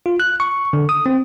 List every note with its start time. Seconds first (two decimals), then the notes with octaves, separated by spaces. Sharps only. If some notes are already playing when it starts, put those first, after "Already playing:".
0.06 F4
0.20 F#6
0.40 C#6
0.73 D3
0.89 D#6
1.06 C4